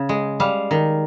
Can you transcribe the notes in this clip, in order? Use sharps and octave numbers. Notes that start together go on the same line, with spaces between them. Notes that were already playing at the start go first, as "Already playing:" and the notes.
Already playing: C#3
G#3
G3 F5
D#3